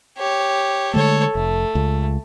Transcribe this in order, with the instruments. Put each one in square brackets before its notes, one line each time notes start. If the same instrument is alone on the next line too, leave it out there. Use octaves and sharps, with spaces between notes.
[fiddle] G4 C#5
[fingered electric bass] D3 G#3 A3 [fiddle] A4 C#5
[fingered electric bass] F1 [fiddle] A3
[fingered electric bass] C#2